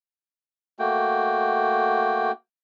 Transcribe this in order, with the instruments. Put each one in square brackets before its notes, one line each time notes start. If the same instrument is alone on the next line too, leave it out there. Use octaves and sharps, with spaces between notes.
[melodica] A3 A#3 F#4 G5